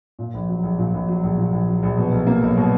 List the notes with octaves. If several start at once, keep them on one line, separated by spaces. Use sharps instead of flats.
A#2
A#1
F#3
A#1
A#2
A#1
F#3
A#1
A#2
A#1
F#3
A#1
B2
B1
A#3
B1
B2